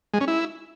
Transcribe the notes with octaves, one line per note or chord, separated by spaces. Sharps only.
G#3
C#4
E4